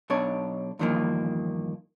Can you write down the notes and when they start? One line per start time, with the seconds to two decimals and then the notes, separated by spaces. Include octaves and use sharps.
0.10 B1 B2 D4 C#5
0.79 E2 G2 D#3 F3 A#3